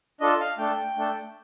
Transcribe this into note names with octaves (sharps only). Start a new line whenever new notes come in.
D4 F4 A4 D#5
F5
A3 D4 A4 G5
A3 D4 A4